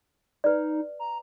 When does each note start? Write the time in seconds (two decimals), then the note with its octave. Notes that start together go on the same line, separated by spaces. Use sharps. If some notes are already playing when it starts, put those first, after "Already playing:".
0.44 D#4 B4 D5
1.00 A#5